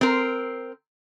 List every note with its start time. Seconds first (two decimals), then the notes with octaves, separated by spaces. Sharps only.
0.01 C4 A#4